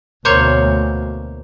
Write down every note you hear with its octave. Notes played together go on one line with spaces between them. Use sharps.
D2 B2 A#3 C5 C#5